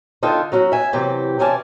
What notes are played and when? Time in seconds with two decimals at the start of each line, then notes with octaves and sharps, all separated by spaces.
0.23 D3 D#4 F4 G5 A5
0.52 F#3 C#4 F#4
0.72 E5 G#5
0.93 C3 E3 F#3 G4
1.39 C3 E3 C#4 D5 G#5 A5